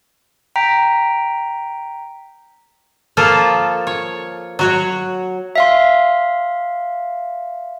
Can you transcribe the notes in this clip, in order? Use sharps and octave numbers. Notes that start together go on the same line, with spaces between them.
G5 A#5 B6
F3 A#3 F4 A4
C#5
F#3 F#4 C#5
E5 F5 C6